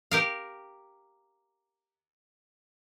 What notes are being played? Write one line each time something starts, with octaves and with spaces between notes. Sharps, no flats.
G4 A#4 F5